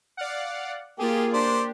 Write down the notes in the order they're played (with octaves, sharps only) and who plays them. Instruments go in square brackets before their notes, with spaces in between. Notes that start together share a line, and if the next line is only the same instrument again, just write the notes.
[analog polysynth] D5 F5 F#5
[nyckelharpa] A#3 [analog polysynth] F4 G#4 [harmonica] G4
[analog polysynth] D4 G4 [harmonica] C5 D5